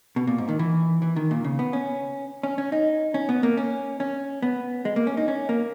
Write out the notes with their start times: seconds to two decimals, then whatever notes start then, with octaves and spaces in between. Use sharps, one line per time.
0.16 B2
0.27 A#2
0.38 G#2
0.49 D#3
0.59 E3
1.02 E3
1.16 D#3
1.31 A#2
1.44 C#3
1.59 B3
1.73 C#4
2.43 C#4
2.58 C#4
2.72 D#4
3.14 C#4
3.29 B3
3.43 A#3
3.57 C#4
4.00 C#4
4.42 B3
4.85 G#3
4.96 A#3
5.07 C#4
5.17 D#4
5.28 C#4
5.49 A#3